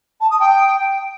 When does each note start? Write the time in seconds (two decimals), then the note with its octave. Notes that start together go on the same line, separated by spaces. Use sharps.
0.20 A5
0.30 D#6
0.40 G5